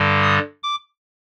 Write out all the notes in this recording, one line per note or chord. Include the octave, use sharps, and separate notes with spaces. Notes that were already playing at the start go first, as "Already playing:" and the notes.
Already playing: G2 D3 G3
D#6
D6